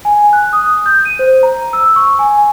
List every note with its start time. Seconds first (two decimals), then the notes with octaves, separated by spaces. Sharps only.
0.05 G#5
0.33 F#6
0.53 D#6
0.86 G6
1.05 D#7
1.19 C5
1.43 A#5
1.73 E6
1.96 C#6
2.19 G#5